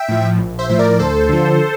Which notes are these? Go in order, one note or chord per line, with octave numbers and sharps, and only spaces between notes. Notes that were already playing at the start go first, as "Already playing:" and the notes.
Already playing: E5 G5
A2 F3
A#1
C5 E5
A2 F3 E5
A#4 D5
D2 A4 C5
D3 F3